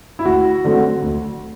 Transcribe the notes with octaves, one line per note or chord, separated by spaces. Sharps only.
E4
D2 F#4
D3 F#3 A3 C4
D2